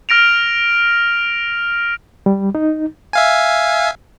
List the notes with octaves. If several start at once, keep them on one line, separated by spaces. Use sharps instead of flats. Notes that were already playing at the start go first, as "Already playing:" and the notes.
F6 A#6 D7 F7
G3
D#4
E5 F5 G#5